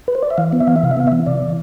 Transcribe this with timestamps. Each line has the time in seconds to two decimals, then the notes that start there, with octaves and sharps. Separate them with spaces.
0.08 B4
0.15 C5
0.22 D5
0.31 E5
0.38 E3 F5
0.53 B3
0.60 E5
0.67 E3 F5
0.76 E5
0.83 C3 F5
0.91 E5
0.97 B3 F5
1.07 E5
1.12 E3
1.26 C3 D5
1.42 E3